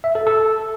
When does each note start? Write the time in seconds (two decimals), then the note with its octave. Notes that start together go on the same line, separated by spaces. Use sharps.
0.04 E5
0.15 A4
0.27 A4